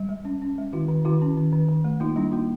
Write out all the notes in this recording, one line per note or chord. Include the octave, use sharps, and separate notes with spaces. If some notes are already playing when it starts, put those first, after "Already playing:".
Already playing: G3
G#3
C#4
C#4
G#3
D#3 E4 F#4
D#3
D#3 E4 F#4
C#4
D#3
D#3
D#3
A3
A#3 D#4 F4
G3 D4 E4
A#3 D#4 F4